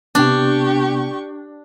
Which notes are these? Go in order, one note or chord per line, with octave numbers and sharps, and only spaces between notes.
C3 B3 D4 G4 C#6